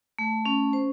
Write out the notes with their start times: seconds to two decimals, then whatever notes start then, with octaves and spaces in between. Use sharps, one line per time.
0.19 A3
0.46 C#4
0.73 C5